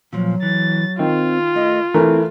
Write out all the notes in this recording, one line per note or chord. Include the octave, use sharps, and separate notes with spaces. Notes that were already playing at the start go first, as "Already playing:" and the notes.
A#2 F3 F#3
E3 A6
D#3 C4 F4
A3 D#5
E3 A3 C4 E4 A#4